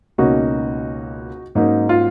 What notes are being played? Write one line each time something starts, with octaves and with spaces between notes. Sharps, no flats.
C#2 B2 A#3 C#4 D#4 F#4
G#2 F#3 A#3 C#4 D#4
F4